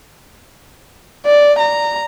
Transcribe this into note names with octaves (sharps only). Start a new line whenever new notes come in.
D5
A#5